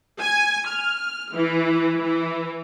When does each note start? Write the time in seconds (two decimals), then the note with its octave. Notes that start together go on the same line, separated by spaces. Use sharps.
0.19 G#5
0.66 F6
1.33 E3
2.00 E3